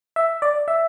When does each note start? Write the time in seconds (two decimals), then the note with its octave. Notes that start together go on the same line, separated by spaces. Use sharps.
0.16 E5
0.42 D5
0.68 E5